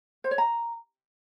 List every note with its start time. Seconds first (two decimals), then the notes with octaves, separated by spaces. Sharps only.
0.24 C5
0.31 C#5
0.38 A#5